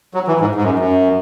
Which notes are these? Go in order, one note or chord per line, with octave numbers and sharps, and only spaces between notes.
F#3
E3
G#2
G#2
F#2
F#2